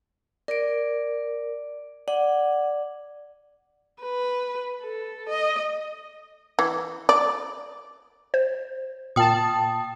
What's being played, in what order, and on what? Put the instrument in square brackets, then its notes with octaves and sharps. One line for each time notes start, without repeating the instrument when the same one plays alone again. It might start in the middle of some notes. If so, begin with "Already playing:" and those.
[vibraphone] A#4 [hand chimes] D5 D7
[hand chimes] D5 [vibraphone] F#5
[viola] B4
A4
D#5
[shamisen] E3
D5
[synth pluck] C5
[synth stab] A#2 A5 [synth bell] G5 D#6